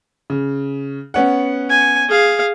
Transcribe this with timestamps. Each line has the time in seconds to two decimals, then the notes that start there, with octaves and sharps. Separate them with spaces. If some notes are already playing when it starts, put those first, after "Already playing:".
0.30 C#3
1.14 B3 C#4 F#5
1.70 G#5
2.09 G#4 F5